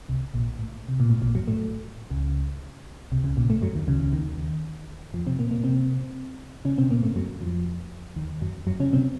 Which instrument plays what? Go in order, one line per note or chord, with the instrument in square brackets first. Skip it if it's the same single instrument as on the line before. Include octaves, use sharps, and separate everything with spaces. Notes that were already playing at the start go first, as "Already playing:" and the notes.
[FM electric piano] C2 C3
A#1 A#2
A2
C3
A#2
A2
A#1 A#2
F#2 F#3
A2 A3
C#2 C#3
C2 C3
C#2 C#3
A#1 A#2
A2 A3
F#2 F#3
D#2 D#3
C#2 C#3
C#2 C#3
D#2 D#3
F2 F3
C3 C4
A#2 A#3
A#2 A#3
C3 C4
C#3 C#4
C3 C4
A#2 A#3
A2 A3
F#2 F#3
F2 F3
D#2 D#3
F#2 F#3
F#2 F#3
C#3 C#4
C3 C4